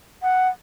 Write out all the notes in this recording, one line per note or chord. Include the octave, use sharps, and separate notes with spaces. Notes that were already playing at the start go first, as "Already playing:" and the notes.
F#5